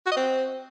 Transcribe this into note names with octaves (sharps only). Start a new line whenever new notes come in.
F#4
D#5
C4